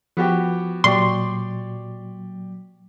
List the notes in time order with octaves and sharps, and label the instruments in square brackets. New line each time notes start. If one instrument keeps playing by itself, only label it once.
[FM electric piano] F3 [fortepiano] B3 F#4 G4
[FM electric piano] A#2 F#3 [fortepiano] G4 D5 C#6 [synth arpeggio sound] C6